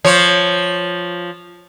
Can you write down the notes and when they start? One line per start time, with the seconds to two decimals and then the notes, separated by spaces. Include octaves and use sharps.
0.05 F3 C#5